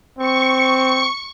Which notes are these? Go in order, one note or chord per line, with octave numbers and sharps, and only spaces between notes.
C4 C#6 C#7